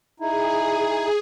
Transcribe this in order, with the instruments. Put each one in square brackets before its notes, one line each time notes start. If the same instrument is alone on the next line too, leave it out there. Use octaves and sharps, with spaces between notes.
[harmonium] D#4 E4 [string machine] G#4